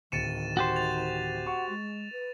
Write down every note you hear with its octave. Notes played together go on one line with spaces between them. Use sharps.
D1 D#3 A6 C#7 D#7 E7
F#4 G4 C5
A6 F7
F#5 C#6
G#3
B4